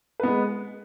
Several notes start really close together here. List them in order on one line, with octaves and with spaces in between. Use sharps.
B4 B3 G#3